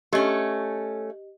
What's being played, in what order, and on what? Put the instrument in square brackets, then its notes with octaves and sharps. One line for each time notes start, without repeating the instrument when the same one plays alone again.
[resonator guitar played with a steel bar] A3 C#4 [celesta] G4 D#5